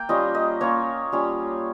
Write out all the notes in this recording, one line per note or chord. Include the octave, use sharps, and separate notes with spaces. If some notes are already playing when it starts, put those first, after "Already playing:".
Already playing: A#3 G5
G3 C#4 F4 D#5
D#5
A#3 C#4 F4 C#5
G3 C#4 F4